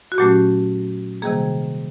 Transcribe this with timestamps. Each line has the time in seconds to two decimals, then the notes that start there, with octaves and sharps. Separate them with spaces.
0.12 F#4
0.18 A#2 F#3 A3 C#4 G4
1.22 C3 D#3 G3 A#3 G#4